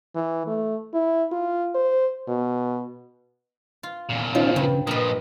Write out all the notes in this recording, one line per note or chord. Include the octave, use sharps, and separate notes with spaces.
E3
A3
E4
F4
C5
B2
F4
E2 A#2
F3 C#4 D#4 F4
G2 C#3
A#2 F3 A#4 B4 D#5